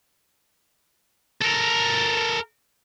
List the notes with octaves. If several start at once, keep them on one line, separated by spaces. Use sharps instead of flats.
A4 A#4